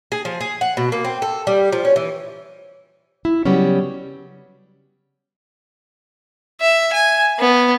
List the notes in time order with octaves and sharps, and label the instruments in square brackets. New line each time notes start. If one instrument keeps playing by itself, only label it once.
[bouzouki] G#4
F3
G#4
F#5
B2
A#3
C4
A4
G3
F3
C#4
E3
[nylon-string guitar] E4
C#3 F#3 G3 B3 C#4
[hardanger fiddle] E5
G#5
B3